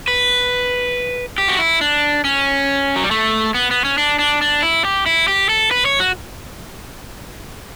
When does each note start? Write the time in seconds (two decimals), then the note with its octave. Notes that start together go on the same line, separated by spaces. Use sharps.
0.08 B4
1.38 G4
1.48 F#4
1.59 E4
1.81 D4
2.24 C#4
2.96 F#3
3.04 G3
3.11 A3
3.54 B3
3.71 B3
3.85 C#4
3.98 D4
4.19 D4
4.41 D4
4.63 E4
4.85 G4
5.06 E4
5.28 G4
5.49 A4
5.71 B4
5.85 C#5
6.00 F#4